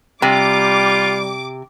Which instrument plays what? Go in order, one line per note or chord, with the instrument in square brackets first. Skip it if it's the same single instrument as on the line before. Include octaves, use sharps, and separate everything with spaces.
[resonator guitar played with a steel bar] C3 [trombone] G3 [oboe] F4 [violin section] D6